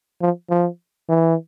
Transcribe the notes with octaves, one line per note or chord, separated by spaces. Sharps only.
F3
F3
E3